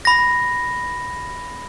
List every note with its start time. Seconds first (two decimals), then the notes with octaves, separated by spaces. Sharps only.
0.05 B5 A#6